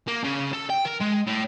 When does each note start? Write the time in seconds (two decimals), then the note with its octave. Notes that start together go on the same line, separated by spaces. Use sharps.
0.08 A#3
0.24 C#3
0.53 A4
0.70 G5
0.86 A#4
1.01 G#3
1.27 A2